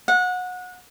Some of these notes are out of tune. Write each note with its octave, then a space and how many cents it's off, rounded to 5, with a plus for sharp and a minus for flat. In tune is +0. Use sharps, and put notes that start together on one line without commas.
F#5 -25